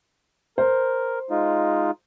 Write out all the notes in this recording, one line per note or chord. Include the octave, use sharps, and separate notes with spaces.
A#4 C5
G#3 D#4 F4